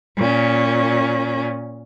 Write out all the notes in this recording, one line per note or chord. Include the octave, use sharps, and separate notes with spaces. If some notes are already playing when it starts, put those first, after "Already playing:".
A#2 C#4